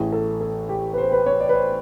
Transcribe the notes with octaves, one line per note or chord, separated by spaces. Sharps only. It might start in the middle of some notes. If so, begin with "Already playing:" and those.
Already playing: A1 A2 E3 G#4
A4
A4
G4
B4
C5
B4
C#5
D5
B4
C5